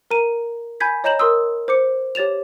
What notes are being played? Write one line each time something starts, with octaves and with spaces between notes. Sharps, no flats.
A#4 A#5 D#7
G#5 B5 G6 G#6 B6
C#5 D#5 A#5 G6 E7 F#7
A#4 C6 D#6 E6
C5 D6 C#7
G4 C#5 A6 E7 F7